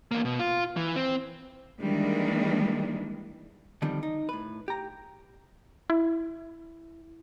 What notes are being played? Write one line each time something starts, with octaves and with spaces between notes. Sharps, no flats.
E2 A#3
B2
F4
E3
C4
D#3 E3 G3 G#3 A#3 D4
D3 D#3 F3 G3 C4
D#4
A2 B4
G4 A#5
E4